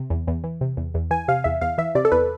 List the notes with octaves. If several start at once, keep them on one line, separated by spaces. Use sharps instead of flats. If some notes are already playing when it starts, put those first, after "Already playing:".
Already playing: C3
E2
E2
E3
C3
E2
E2
E3 G#5
C3 F5
E2 E5
E2 F5
E3 E5
C3 D5
A4
E2 B4